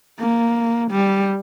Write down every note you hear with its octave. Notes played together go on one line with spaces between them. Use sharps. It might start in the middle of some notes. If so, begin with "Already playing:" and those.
A#3
G3